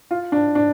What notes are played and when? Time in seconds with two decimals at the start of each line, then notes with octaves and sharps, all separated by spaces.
0.11 F4
0.32 D4
0.55 D4